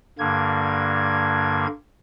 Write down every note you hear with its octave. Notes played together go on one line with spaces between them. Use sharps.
G2 D3 A#3 G#6